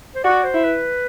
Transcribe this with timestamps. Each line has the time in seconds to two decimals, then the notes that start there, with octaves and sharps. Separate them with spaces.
0.15 C5
0.24 F#4 D5
0.44 C5
0.54 E4
0.64 B4